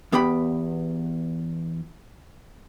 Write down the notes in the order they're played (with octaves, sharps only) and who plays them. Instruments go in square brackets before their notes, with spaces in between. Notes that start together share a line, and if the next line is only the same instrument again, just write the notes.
[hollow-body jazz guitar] E2 B3 G4 G5 B5